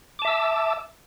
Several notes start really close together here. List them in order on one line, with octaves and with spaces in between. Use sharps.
D6 A5 E5 E6